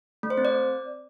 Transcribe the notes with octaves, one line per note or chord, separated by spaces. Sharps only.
A3
C5
C4
D5